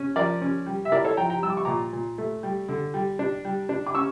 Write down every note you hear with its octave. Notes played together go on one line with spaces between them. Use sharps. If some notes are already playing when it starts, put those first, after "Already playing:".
Already playing: C#4
F3 A#4 D5
C#4
G3
E5
E4 A#4 D5
A4 C#5
F3 G5 A#5
G5 A#5
G3 E6
D6
C#6
A#2 A#5 D6
A#2
A3
G3
D3
G3
D4
G3
D4
D6
C#4 C#6 E6